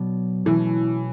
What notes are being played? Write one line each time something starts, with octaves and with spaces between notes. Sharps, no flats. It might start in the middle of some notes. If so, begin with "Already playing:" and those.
Already playing: B2 F#3 B3 D4
B2 E3 A3 C#4 E4 B4